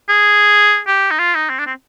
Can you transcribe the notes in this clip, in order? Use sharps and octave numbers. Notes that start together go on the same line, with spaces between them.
G#4
G4
D#4
F4
D#4
C4
D4
C4